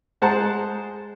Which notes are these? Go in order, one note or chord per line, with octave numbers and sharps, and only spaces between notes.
G#3 C5 F#5 A5 A#5